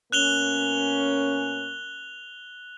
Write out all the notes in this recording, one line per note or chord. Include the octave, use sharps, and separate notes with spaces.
B2 A#3 C#4 F#6 F7 G7